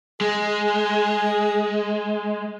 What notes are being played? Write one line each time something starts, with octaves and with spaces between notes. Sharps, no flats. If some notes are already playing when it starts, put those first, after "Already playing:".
G#3 G#4